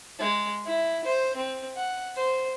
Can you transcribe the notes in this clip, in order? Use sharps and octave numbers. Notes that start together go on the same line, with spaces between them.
G#3
E4
C5
C4
F#5
C5